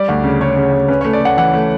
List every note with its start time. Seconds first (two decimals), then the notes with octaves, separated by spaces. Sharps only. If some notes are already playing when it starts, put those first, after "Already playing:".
Already playing: G3 D5
0.08 D2
0.24 C#3
0.40 C#3 C#5
0.56 C#3
0.73 D2
0.88 C#4 B4
1.01 C#5
1.05 A3
1.13 D5
1.21 A3 F#5
1.37 E3 F#5
1.54 A3